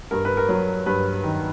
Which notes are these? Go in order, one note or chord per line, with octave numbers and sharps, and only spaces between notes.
G2 A#4
B4
A#4
F#3
G2 B4
D#3